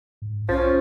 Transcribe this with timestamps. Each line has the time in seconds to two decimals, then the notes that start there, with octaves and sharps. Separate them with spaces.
0.22 G#2
0.49 B1 F3 C#4